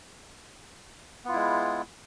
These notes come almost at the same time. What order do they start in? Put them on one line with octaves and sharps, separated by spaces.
B3 F4 E4 G#3